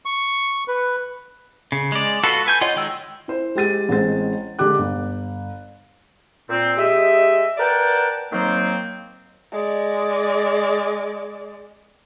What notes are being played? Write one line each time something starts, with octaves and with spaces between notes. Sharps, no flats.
C#6
B4
C#3
G#3 D5
F4 F#4 A4 B4
B4 G#5 G6
F4 C#5 D#5 F#5
D#3 G#3 G5 E6
E4 C5
G#3 G4 A6 D#7
A1 G#3 C4 C5 A6
D3 G#3 G4 D6 F#6
G1
A#2 C4
G#3 G4 D#5 E5
A#4 B4 D5 F#5 G5 A5
D#3 F#3 A#3 C4
G#3 D5